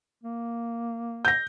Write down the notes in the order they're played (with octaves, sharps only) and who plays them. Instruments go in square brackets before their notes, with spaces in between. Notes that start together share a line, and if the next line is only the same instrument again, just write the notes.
[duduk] A#3
[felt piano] G6 A#6